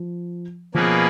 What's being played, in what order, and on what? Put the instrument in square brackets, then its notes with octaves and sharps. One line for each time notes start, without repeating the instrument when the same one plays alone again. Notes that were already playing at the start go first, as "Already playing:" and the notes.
Already playing: [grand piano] F3
[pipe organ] B2 A#3 C#4 G#4 B4 [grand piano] F3